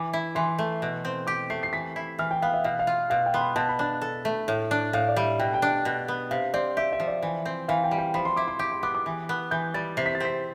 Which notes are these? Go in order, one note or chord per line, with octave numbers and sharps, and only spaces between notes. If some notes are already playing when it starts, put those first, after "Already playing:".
Already playing: E3 D6
E4
E3 C6
A3
B2
C4
G4 D6
A3 C7
C7
E3 B6
E4
E3 F6
G5
B3 F5
E5
B2 F5
F5
F4
B2 F5
G5
B3 C6
B5
B2 A5
B5
D4 A5
A4
A3
A2
D4
A2 F5
D5
G3 E5
B2 G5
G5
D4
G5
B2
B3
C3 F5
C4 D5
G4 E5
E5
F3
D5
E3
C4
E3 F5
G5
G3
G5
F3 B5
C6
E4 D6
C6
G4 D6
C6
B3 D6
D6
E3
B3
E3 G6
G3 A6
C3 C7
B6
A6
C4 B6